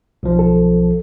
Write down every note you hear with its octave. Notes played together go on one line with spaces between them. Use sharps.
B1 F3
A4